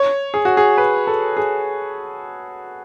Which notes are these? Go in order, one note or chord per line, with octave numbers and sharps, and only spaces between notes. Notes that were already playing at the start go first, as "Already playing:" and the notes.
Already playing: C#5
G#4
F#4
G#4
B4
A4
G#4